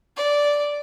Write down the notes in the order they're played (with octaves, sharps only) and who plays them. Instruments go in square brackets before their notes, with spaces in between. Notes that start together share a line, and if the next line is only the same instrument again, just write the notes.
[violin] D5